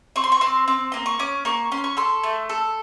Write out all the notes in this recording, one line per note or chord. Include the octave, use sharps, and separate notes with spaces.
C4 C#6
C6
C#6
C4 C6
C4
A#3 C6
C#6
C#4 D6
A#3 C#6
C#4 C6
C#6
A4 C6
A3
A4